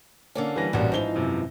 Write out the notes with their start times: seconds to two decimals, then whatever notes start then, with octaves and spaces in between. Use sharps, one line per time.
0.35 D3 A#3 C#4
0.56 E3 G3 A#6
0.73 A1 G2 A#2 G3 F#4
0.92 G#2 E3 F3 D#4 G7
1.16 F#2 C3